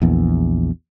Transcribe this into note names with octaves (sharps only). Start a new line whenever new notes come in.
A#1 E2